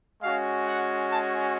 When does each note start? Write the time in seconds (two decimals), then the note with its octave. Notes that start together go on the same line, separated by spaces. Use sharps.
0.23 G#3 C#4 F#4 F5
0.67 F#5
1.11 A5